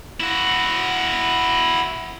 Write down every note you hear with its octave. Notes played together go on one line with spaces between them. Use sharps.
E4 F#4